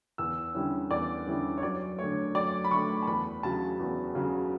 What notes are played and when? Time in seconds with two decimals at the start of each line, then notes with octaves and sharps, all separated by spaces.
0.18 E2 E6
0.54 D3 G3 C#4 E4
0.91 E2 D5
1.27 D3 G3 C#4 E4
1.58 C#5
1.63 F#2 D5
1.98 D3 A3 C#5
2.34 F#2 D5
2.64 B5
2.71 D3 A3 C#6
3.03 A5
3.07 E2 B5
3.43 C#3 F#3 A5
3.79 E2
4.15 C#3 F#3